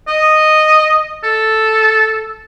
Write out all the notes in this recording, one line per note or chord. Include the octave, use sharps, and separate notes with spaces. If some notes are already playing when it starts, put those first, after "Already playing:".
D#5
A4